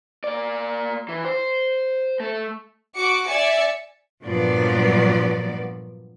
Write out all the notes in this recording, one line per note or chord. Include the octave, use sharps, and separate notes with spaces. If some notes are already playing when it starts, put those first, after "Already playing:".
A#3 D5
E3
C5
A3
F#4 D6 C#7
D5 E5 G#5 C#7
G2 A#2 F3 F#3 B3 D5